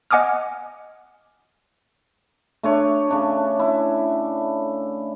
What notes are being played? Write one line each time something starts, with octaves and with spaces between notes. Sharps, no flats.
D#5 F#5 G#5 D6 D#6 F6
A3 D4 C#5
C#3 D4
E4